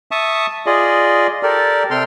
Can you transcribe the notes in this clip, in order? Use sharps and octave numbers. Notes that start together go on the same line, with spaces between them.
E5 A5 C#6 D#6
F4 G#4 D5 D#5
G4 A4 A#4 D5
C3 A4 G5 C6 F6